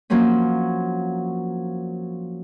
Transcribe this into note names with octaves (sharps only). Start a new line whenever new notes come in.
F3 F#3 A#3 C4 C#4